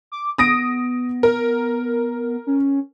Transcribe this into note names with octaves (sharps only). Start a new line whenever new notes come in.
D6
B3 D#6 A#6 D7
A#4
C#4